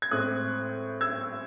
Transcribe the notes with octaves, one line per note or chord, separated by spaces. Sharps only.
G#6
A2 G#3 C4 D#6 F#6
E6 G#6